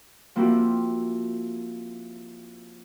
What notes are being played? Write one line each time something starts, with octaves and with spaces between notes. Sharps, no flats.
F3 A#3 C4 E4 F#4 G4